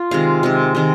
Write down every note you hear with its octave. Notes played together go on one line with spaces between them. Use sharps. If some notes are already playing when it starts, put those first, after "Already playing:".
Already playing: F4
C3 D#3 G#3 F5
C3 D#3 G#3
C3 D#3 G#3